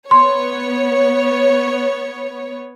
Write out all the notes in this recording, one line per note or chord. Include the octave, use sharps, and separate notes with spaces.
B3 C#5 C6